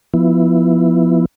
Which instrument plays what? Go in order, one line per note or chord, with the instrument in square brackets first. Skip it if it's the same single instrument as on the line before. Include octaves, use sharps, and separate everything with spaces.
[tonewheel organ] F3 B3 E4